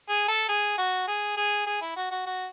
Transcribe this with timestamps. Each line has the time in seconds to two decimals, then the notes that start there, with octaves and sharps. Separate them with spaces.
0.09 G#4
0.28 A4
0.49 G#4
0.78 F#4
1.08 G#4
1.37 G#4
1.66 G#4
1.82 E4
1.96 F#4
2.11 F#4
2.26 F#4